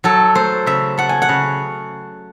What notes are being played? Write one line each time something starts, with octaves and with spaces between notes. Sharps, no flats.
F#3 A4
A3 C5
C#3 E5
A3 F#5
G#5
F#5
C#3